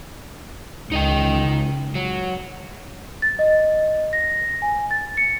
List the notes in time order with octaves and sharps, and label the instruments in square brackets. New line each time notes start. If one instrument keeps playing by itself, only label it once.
[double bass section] C#2 [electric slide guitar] D#4 D#5 G5
[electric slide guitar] F#3
[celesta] A6
D#5
A#6
G#5
A6
C#7